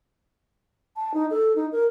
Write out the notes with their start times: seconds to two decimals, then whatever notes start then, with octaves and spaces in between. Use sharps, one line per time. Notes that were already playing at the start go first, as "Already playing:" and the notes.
0.96 A5
1.14 D#4
1.30 A4
1.56 D#4
1.72 A#4